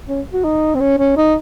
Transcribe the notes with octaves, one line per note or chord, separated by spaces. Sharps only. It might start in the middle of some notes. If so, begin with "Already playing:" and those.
C#4
F#4
D#4
C4
C#4
C#4
D#4